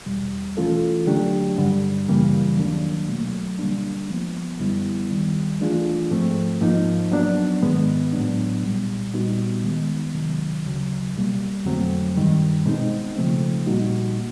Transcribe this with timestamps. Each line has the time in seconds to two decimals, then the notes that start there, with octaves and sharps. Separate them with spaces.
0.06 E2 B2 G3
0.57 E3 A3 C#4 F4 A4
1.07 D3 F#3 A3 D4 G4
1.58 G2 D3 G3
2.08 F#2 C#3 E3 G3 A#3
2.58 D#2 D#3 F#3 A#3 D4
3.08 B2 F#3 A3
3.59 D3 G3 A#3 D4
4.10 F3 G#3 B3
4.59 F#2 D3 G3 B3 E4
5.11 D#2 D#3 G3
5.61 E3 A3 D4 F4 G#4
6.11 G#2 F3 A3 C4
6.61 G#2 F3 A#3 D#4
7.12 F#3 B3 D4
7.62 G#2 D#3 G#3 B3
8.13 A2 F#3 B3 D4
8.63 C2 A#2 G3
9.13 A#2 G3 B3 D#4 F#4
9.63 D#3 G#3 B3
10.13 D2 C3 D#3 F#3
10.64 D2 C#3 F#3
11.14 C#2 B2 G3 A#3
11.65 F2 D3 F#3 A3 C4
12.16 G2 D#3 G3
12.66 B2 G#3 C4 D#4
13.16 C#3 F3 A3 C4
13.67 A#2 G3 A#3 D#4 F#4